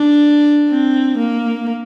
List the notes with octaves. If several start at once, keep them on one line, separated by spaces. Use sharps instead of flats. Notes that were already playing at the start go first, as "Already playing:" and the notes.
Already playing: D4
C4
A#3